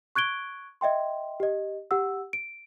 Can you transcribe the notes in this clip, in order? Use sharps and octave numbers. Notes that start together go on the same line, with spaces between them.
C#6 F#6 G#6 D7 G7
D#5 E5 G5 C6
G4 D#5
G4 F#5 E6
D7